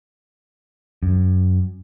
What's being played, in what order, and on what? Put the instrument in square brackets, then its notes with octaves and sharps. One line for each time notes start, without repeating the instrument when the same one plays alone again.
[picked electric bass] F#2